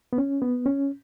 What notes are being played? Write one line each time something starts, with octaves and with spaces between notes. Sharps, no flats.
B3
C#4
B3
C#4